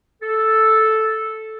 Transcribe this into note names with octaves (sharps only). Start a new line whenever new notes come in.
A4